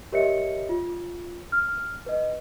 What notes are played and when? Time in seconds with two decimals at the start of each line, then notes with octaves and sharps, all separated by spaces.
0.12 G4 A#4 C#5 D#5 E5 C#7
0.69 F4
1.52 F6
2.06 B4 D#5